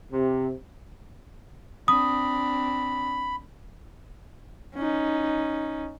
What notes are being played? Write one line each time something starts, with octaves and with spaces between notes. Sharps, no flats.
C3
C4 D4 B5 D#6
C#4 D#4